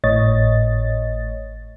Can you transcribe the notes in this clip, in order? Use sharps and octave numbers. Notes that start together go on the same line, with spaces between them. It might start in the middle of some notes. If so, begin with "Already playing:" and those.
G#1 A2 C#5 D#5 A6